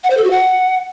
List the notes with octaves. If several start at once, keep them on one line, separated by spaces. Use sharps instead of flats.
F#5
C5
A4
F#4
F#5